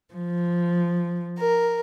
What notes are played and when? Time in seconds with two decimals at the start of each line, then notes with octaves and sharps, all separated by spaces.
0.14 F3
1.38 A#4